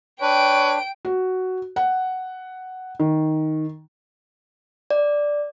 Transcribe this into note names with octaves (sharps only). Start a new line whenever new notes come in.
D4 B4 C#5 G5 D7
F#4
F#5
D#3
D5